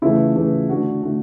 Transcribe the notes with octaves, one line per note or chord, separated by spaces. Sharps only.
C#3 E3 A3 E4
C#3 E3 A3
D3 A3 D4 F#4
D3 A3 D4